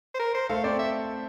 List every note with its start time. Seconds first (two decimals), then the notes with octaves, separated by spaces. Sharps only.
0.14 C5
0.19 A#4
0.35 C5
0.49 A3 A4 F5
0.64 C4 C5 D5
0.79 E5